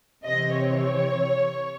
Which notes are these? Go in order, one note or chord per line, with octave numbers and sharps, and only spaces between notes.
C3 E3 C4 D#5
C#5